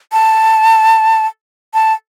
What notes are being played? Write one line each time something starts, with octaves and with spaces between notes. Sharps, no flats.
A5
A5